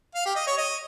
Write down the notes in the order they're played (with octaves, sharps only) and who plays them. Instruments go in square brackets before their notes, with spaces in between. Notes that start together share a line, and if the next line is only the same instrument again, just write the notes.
[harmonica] F5
G4
D#5
C#5
D#5